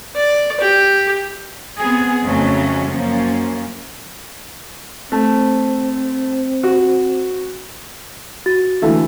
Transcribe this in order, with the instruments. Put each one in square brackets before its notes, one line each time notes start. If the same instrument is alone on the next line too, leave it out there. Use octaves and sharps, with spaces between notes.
[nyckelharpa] D5
G4
[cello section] B3 C4 G#4
F2 C#3 F#3 A3 C#4
F#2 F3 A#3 C#4
[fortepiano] A3 [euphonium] C4
[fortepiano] F#4
[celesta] F#4 A6
[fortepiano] D3 E3 A3